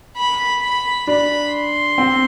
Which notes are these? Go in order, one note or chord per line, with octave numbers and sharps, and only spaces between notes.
B5
B5
D4 B5
C6
C4